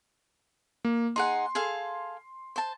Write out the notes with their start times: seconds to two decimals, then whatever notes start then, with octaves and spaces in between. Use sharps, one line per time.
0.85 A#3
1.16 D#4 G#4 F#5 C6
1.55 G#4 A4 F5
2.56 C5 A5